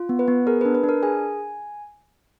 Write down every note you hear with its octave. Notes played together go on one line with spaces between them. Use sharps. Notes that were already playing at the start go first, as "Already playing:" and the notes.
Already playing: F4
B3
B4
B3
G#4 A#4
D4 B4
B4
D4
A#4
G#4 G#5